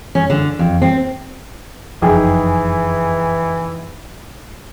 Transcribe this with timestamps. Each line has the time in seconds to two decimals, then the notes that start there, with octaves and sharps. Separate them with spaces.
0.15 C#4
0.30 D3
0.59 F2
0.82 C4
2.02 F#1 F2 E3 D#4 G#4 G5